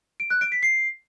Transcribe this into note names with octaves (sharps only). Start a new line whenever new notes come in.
D7
F#6
D7
B6
C7